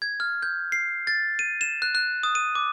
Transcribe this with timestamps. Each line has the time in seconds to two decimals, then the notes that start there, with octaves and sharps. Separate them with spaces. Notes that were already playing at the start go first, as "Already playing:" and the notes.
0.02 G#6
0.20 F6
0.43 G6
0.72 C7
1.07 A6
1.39 D#7
1.61 E7
1.82 F#6
1.95 F#6
2.23 D#6
2.35 D#7
2.55 D6